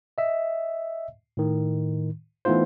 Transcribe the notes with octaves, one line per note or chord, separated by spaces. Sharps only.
D#5 E5
A2 D#3
E3 A3 B3 D#4 F4 C5